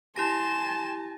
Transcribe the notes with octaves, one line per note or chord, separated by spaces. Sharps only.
E4 G4 G#5 A5 C6 A#6 E7